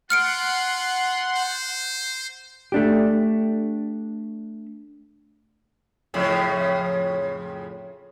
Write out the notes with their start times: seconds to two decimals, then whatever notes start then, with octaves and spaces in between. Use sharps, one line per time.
0.10 F4 F#5 C6 F6 C#7 D7
1.35 C5
2.72 A3 D4 G4
6.14 F2 A2 C#3